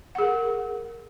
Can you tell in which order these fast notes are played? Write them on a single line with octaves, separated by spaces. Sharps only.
F#5 G#4 A#4